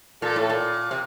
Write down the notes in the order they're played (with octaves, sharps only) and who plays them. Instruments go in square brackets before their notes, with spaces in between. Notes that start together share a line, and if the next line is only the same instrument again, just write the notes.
[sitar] A#2 [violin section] A4
[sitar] A2
A#2
C3